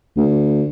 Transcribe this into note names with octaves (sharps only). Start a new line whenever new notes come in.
D2